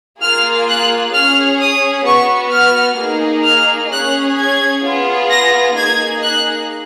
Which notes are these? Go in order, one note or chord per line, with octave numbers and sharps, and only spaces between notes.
A#3 F4 G#4 F6
F#6
C#4 G#4 F6
D#6
B3 F#4 C#6
F6
A#3 D#4 G#4
F6
C#4 G#4 F#6
G#6
B3 F4 G#4
A#6
A#3 D#4 G#4 G#6
F#6